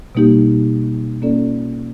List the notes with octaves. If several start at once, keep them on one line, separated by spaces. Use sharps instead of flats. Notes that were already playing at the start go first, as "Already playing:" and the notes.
B2 G3 A#3 D#4 G4
A#3 C#4 F4 A4 D5